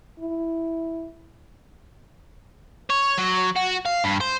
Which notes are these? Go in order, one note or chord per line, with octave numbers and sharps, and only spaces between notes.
E4
C#5
F#3
F#4
F5
G2
C5